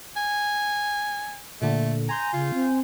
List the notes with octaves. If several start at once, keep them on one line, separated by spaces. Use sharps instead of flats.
G#5
A#2 D3 A3
G#5 A#5 C6 G6
C#3 F4
C4